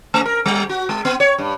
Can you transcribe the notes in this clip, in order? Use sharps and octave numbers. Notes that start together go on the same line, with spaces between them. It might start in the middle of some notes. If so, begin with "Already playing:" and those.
A3
A#4
G3
F#4
G#3
B3
C#5
G2